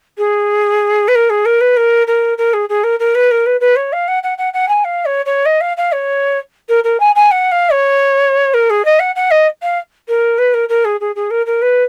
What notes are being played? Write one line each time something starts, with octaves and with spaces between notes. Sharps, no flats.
G#4
B4
A#4
G#4
A#4
B4
A#4
A#4
A#4
G#4
G#4
A#4
A#4
B4
A#4
B4
B4
C#5
F5
F#5
F#5
F#5
F#5
G#5
F5
C#5
C#5
D#5
F5
F5
C#5
A#4
A#4
G#5
G#5
F#5
F5
C#5
A#4
G#4
D#5
F#5
F#5
D#5
F5
A#4
B4
A#4
A#4
G#4
G#4
G#4
A#4
A#4
B4